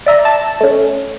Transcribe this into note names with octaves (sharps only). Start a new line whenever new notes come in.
D5 E5 A#5
A5
A3 C#4